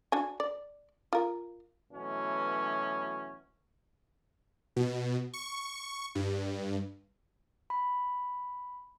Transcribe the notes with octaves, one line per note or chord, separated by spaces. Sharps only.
D4 F#4 G#5
D5
F4 A#4
B2 E3 F#3 A3 B3 C#4
B2
C#6
G2
B5